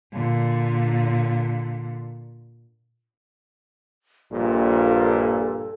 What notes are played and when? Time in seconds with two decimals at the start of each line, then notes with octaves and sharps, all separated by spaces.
0.13 A#2 D3
4.32 A#1 G2 A#2 A4